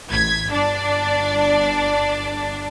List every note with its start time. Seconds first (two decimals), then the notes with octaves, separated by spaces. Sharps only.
0.10 A1 G#6 B6
0.50 G1 D4 D5